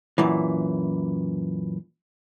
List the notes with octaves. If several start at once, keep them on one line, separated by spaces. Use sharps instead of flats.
F#2 A#2 E3